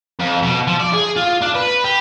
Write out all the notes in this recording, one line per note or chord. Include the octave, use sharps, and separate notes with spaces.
F2
B2
F3
D5
G#4
F4
D4
B4
G4